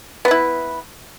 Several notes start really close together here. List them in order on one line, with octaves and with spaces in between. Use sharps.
B3 B4 E4